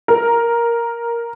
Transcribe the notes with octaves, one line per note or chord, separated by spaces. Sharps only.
A#4